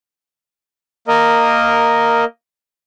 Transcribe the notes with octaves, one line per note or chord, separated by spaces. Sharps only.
A#3 A#4 D#5